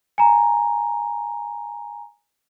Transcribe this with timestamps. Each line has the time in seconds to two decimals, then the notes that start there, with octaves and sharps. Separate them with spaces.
0.18 G#5 A#5